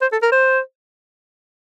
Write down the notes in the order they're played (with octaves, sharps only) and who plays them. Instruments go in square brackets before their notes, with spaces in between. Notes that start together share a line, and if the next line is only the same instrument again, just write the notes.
[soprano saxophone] C5
A4
A#4
C5